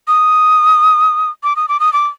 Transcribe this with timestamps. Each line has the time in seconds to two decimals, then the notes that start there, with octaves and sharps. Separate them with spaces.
0.08 D#6
1.43 D6
1.56 D#6
1.68 D6
1.80 D#6
1.93 D6